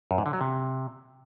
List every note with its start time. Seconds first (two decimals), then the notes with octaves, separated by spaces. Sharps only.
0.11 F#2
0.18 G#2
0.26 D3
0.33 F#3
0.41 C3